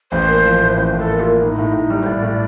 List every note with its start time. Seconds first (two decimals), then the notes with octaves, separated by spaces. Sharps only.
0.11 A1 C5
0.28 A#3
0.44 F3
0.61 A2
0.77 A1 C5
0.93 A2
0.99 A4
1.09 A#3
1.20 A#3 F4
1.42 A2 D#4
1.59 A2
1.74 A2
1.90 G3
2.03 C5
2.06 A2 D5
2.23 A2